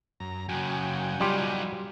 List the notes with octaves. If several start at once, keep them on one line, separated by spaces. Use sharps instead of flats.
F#2 A#5
F#2 C#3 F#4 G5 G#5
F#3 G3 D#4 F4 G4